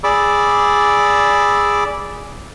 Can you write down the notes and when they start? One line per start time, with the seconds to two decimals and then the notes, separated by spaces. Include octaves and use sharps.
0.04 G#4 D5 B5 D6 E6